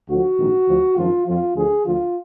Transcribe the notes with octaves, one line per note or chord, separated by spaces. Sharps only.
D2 D3 F3 F#4
A#1 G#2 D#3
D2 D3 F3
G#1 F#2 F3 F4
F2 F3 F4
D2 D3 F3 G#4
D2 D3 F3 F4